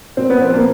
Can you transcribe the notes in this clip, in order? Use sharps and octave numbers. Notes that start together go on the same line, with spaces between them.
A#2 C4
B3
F3 C4
A#3